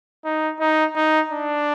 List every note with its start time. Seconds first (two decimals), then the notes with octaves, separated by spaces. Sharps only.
0.25 D#4
0.60 D#4
0.96 D#4
1.32 D4